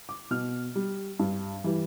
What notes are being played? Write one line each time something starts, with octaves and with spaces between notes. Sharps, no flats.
D6
B2 F6
G3
G2
E3 G3